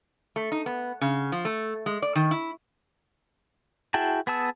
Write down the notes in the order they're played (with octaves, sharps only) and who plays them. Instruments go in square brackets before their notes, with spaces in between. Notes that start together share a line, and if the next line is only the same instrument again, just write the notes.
[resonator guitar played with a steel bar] A3
D#4
B3
C#3
F3
A3
G#3
D5
D#3
E4
[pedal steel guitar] E4 F#4 G#4 G5 A5
B3 G#4 A5 E6